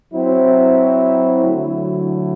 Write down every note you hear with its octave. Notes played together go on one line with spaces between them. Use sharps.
F#3 C4 E4
D3 F#3 A3 E4